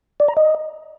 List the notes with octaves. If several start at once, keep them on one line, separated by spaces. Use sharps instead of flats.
D5
A#5
D#5